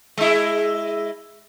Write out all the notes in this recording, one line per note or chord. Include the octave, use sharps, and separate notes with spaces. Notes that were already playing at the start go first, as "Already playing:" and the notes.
G#3 E4